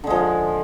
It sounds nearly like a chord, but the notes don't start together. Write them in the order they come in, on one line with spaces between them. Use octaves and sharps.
D3 G#3 F3